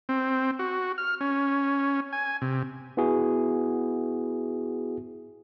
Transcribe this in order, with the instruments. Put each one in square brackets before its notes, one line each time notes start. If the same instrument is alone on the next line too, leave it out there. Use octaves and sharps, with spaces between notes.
[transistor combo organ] C4
F#4
F6
C#4
G#5
C3
[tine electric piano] B3 E4 F#4 G#4